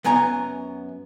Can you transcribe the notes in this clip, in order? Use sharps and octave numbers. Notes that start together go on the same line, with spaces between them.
F#2 B3 G#5 A#5